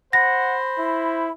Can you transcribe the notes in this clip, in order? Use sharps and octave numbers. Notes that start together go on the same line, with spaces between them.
C5 F#5 B5 A#6
E4